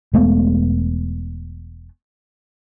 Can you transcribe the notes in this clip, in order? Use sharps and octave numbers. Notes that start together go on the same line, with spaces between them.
E1 G#3 A3 B3